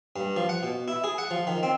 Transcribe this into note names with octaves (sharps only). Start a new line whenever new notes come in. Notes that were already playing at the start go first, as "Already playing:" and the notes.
G2
F3
F#5
B2
E4
G#4
F#5
F3
D#3
C4